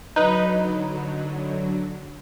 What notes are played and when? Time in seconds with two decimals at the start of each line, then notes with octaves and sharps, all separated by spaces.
0.16 D3 F#3 D#4 B4